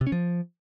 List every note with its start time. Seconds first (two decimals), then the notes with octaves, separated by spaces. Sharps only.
0.01 C3
0.07 C#4
0.12 F3